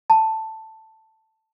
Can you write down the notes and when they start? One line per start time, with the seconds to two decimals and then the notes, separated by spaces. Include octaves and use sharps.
0.10 A5